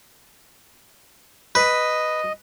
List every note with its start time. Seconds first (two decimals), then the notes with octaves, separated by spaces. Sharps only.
1.55 B4 D#5